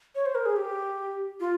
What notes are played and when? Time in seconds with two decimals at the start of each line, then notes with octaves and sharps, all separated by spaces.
0.15 C#5
0.26 C5
0.35 A#4
0.46 G#4
0.56 G4
1.40 F4